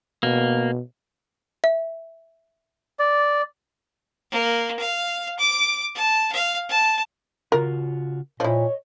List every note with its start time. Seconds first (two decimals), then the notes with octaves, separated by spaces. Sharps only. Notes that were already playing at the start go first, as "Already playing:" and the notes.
0.23 B2 A#3
1.64 E5
2.99 D5
4.31 A#3
4.79 F5
5.39 D6
5.95 A5
6.32 F5
6.69 A5
7.52 C#3 F4 F#4 A#4
8.40 A#2 F3 E4 C#5 D#5